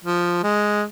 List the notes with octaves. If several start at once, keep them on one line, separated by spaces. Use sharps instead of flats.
F3
G#3